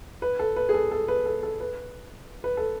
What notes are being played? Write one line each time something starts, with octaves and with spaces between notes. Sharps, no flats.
B4
A4
B4
G#4
A4
A4
B4
A4
A4
B4
B4
A4